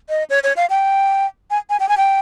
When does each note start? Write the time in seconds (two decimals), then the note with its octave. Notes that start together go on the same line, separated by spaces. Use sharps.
0.09 D#5
0.30 C#5
0.43 C#5
0.56 F5
0.70 G5
1.51 G#5
1.70 G#5
1.80 G5
1.89 G#5
1.97 G5